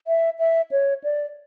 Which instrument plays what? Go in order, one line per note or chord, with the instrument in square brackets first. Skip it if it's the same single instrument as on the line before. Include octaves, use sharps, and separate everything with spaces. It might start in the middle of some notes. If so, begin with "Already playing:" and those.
[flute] E5
E5
C#5
D5